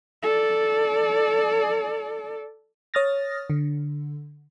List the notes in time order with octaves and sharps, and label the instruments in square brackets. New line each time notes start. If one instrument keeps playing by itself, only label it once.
[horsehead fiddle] A4 D5
[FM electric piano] C#5 D#6 F6 A6 A#6
D3